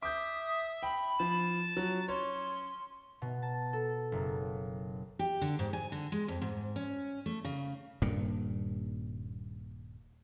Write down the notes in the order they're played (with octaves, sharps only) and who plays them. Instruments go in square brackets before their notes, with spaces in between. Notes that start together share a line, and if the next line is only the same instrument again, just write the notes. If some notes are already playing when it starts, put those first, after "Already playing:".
[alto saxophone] E5 [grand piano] D6 G6 [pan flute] D#6
[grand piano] G5 [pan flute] B5
[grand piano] F3 [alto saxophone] A5
[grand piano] F#3 [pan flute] F4
[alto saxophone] C#4 [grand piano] C#5 [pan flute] C6
[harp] B2
A5
A4
F#1
[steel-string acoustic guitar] G4
D3
G#2
G#5
D3
G#3
F2
G#2
C#4
A3
C#3
[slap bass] D#1 G2 A#2 A#3